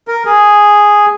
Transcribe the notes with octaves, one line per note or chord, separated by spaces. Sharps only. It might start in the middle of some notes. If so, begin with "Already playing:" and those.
A#4
G#4